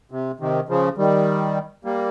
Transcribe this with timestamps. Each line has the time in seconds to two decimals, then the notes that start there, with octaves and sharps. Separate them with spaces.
0.11 C3
0.40 C3 D#3
0.69 C#3 F3
0.98 D#3 G3
1.85 G3 A#3